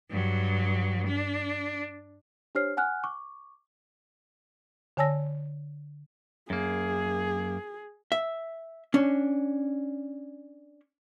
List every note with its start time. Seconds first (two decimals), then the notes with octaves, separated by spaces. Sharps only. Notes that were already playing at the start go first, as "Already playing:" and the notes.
0.10 G2 F#3
1.07 D4
2.55 D4 G4 C5 C#5 F6 C7
2.77 F#5 G#5 F6 F#6
3.04 C#6 D6
4.97 D3 C#5 G#5 A5 E6 A#6
6.50 F#2 A#3 G#4
8.12 E5
8.94 C#4 D4